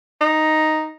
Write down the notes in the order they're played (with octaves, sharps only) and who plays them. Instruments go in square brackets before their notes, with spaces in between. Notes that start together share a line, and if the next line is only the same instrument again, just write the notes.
[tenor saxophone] D#4